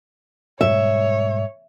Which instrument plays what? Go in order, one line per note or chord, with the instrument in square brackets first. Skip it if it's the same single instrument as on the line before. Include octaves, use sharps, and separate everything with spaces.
[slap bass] G#2 B2 G3 [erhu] C#5 [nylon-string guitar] E5